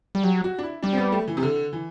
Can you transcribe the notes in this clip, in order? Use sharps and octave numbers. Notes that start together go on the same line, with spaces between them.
G3
F#3 G4
F#4
D4
E4
G3 D4
C4
B3
A3
E3
C3
D3
E3